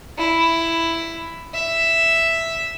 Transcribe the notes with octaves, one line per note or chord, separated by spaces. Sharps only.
E4
E5